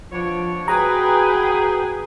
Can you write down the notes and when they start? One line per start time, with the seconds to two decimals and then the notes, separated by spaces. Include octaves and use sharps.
0.12 B2 F3 D4 C#5
0.68 F#4 G#4 B4 G5 G#5 A#5